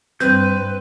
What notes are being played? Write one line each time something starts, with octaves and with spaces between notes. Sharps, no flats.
G2 C4 B4 G6